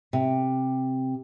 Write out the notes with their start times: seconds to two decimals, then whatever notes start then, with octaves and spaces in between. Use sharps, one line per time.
0.13 C3